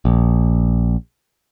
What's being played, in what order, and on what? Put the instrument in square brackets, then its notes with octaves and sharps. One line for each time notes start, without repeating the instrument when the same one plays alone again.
[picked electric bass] A#1